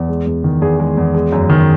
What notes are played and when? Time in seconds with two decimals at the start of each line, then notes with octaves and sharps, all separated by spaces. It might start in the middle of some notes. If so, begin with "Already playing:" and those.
Already playing: E2
0.09 G#3
0.26 E2
0.44 D#3
0.61 E2 G#4
0.80 G#3
0.97 E2
1.14 G#3
1.32 F#2
1.50 D#3